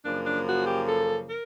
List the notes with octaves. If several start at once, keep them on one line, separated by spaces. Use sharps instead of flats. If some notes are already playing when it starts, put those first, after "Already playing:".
F#2 C#3 F3 A#3 D4
D4
F#4
G4
A4
A#4